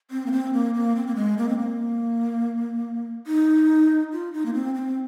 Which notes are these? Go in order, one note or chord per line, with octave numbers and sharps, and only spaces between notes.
C4
A#3
C4
A#3
A#3
C4
A#3
G#3
A#3
C4
A#3
D#4
F4
D#4
A#3
C4
C4